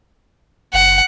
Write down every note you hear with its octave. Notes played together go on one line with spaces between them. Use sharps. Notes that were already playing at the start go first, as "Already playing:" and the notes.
F#1 F#5